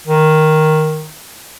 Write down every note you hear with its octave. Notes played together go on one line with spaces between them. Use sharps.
D#3